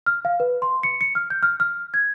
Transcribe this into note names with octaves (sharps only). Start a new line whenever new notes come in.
F6
F5
B4
C6
C#7
C#7
F6
G6
F6
F6
G#6